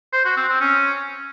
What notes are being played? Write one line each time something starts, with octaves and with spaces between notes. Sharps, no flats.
C5
F#4
C4
C4
C#4